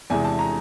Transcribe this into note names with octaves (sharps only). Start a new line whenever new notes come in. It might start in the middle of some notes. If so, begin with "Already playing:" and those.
E2 C3 E3 G#3 G#5
A5
A#5